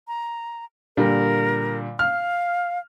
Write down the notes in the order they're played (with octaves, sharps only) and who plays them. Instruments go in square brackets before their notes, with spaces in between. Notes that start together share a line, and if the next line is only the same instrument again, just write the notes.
[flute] A#5
[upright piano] A#2 D3 G3 [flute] A#4
[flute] F5 [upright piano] F6